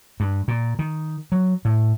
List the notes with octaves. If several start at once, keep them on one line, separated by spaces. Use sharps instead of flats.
G2
A#2
D#3
F#3
A2